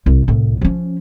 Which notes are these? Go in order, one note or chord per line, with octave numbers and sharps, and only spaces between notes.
C2 E4
C2 A2
F3 C#4